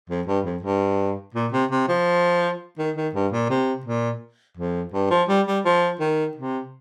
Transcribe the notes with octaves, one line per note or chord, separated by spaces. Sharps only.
F2
G2
F2
G2
A#2
C3
C3
F3
D#3
D#3
G2
A#2
C3
A#2
F2
G2
F3
G3
G3
F3
D#3
C3